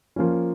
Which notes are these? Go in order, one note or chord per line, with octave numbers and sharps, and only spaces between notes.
F3 A#3 C#4